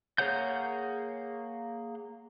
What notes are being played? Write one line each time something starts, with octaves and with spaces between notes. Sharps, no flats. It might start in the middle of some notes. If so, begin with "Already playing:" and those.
A#3 G#4 C#5 F#5 G6